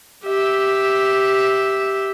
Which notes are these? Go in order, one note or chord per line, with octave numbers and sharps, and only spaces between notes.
G4 E5